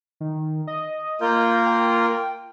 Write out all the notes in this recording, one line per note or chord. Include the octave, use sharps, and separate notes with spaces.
D#3
D#5
A#3 F4 A#4 G6
G5